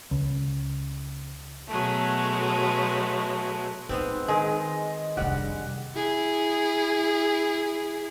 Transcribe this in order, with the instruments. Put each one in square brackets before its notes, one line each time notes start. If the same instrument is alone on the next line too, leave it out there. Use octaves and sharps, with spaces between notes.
[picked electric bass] C#2
[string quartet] B2 F#3 G#3 A3
[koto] G#3 B3 C4 [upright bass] D#4
[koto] D#3 G#4 [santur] G#3
[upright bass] F1 D4 [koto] G3 [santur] F#5
[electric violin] E4 G#4